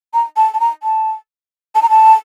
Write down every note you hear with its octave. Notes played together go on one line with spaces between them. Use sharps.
A#5
A5
A5
A#5
A5
A5
A#5
A5